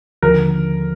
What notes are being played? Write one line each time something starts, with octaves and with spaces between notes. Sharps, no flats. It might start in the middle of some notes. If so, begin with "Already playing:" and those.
D#2 D3 F3 A#4